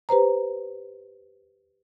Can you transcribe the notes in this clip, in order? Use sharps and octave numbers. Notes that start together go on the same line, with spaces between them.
G4 B4 C5 A#5